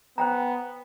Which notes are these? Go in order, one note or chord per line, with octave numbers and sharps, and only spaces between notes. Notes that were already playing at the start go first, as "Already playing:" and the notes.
B3 C5 G5 A#5